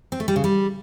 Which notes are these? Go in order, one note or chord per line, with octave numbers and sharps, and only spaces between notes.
C4
A3
G3
C#3
G3